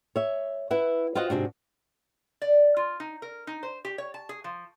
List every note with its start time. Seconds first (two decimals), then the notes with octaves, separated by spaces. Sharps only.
0.16 C#5 E5
0.70 E4 B4 E5 F#5
1.15 F4 F#4 C5 D#5 F#5
1.30 G#2 C3 D4 F#4
2.42 D5
2.77 F4
3.00 D#4
3.22 A#4
3.47 D#4
3.63 C5
3.85 G4
3.98 C#5
4.14 A5
4.29 G#4
4.44 F3